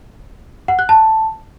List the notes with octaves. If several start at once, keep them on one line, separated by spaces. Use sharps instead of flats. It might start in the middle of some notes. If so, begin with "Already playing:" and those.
F#5
F#6
A5